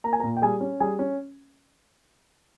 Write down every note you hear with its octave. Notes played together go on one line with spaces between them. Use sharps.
A#3 A#5
G#5
A#4 A#5
A#2
G5
G3 G#4 G#5
C#4
G3 G#4 G#5
C#4